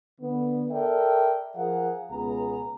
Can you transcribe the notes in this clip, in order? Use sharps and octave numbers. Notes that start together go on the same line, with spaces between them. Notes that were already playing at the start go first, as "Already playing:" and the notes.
D3 B3
A4 A#4 D5 E5 G5
F3 G#4 A#4 F5 F#5
C#2 B2 B3 G#4 A#5